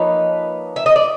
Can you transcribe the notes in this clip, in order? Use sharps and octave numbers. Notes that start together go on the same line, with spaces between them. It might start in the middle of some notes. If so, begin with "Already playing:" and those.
Already playing: F3 A#3 D#4 B4 C#5
E5
D#5
D5